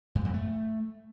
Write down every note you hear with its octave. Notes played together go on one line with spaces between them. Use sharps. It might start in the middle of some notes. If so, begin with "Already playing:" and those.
G2
F2
A3